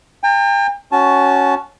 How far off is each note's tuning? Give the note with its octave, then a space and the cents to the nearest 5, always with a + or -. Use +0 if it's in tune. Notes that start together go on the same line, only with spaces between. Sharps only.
G5 +35 A#5 -45
C#4 +0 F#4 +0 A5 -15